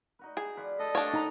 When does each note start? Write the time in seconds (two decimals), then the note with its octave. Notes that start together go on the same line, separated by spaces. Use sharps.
0.19 D#4 F#4 B4
0.37 G#4
0.57 F3 B4 D5
0.79 A3 D4 A4 D#5
0.95 D4 G4 C#5 F5
1.14 D#4 A#5